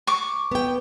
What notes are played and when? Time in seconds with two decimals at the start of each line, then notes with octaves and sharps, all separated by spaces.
0.07 C#6 D6
0.51 B3 G5